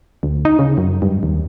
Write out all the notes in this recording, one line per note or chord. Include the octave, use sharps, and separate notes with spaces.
D2
D#4
C#3
F#2
G2
D#2